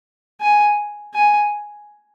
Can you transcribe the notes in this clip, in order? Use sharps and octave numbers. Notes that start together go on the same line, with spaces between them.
G#5
G#5